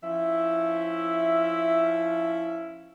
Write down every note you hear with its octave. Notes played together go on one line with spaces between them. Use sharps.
F3 C#4 E4 E5